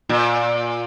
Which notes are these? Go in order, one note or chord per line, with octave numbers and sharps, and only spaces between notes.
A#2